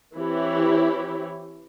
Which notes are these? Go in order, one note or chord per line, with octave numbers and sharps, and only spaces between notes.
E3 C4 E4 G4 C#5